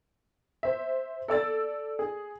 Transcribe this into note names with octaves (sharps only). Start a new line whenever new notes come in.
C5 E5
A4 D5 E6 A6
G#4